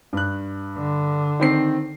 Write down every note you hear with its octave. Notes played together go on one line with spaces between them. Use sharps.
G2 F#6
D3
D#3 C4 C7